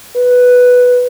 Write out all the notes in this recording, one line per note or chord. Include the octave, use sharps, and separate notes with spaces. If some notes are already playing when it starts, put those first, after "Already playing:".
B4